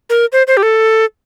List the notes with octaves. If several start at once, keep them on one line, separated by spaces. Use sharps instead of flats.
A#4
C5
C5
G4
A4